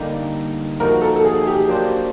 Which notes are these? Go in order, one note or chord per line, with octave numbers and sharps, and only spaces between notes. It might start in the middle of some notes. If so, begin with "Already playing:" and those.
Already playing: D3 G3 A#3 D#4 G4
F3 A#3 D#4 F#4 A#4
A4
A4
G#4
G#4
G4
F#3 A#3 D4 G4 C5